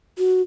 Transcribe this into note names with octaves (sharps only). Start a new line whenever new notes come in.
F#4